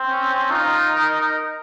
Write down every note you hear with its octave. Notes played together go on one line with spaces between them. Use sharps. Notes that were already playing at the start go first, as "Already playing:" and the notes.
Already playing: C4
C#4
D#4 F4
A#4